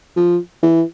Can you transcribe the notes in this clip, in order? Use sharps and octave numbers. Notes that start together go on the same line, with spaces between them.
F3
E3